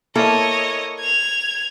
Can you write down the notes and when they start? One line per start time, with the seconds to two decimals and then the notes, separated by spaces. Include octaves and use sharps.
0.15 A#3 E4 A4 C#5 D#5
0.99 G#6 F7